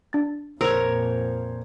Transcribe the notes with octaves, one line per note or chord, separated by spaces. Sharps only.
D4 A6
F2 A#2 A#4 C5 C#5 E6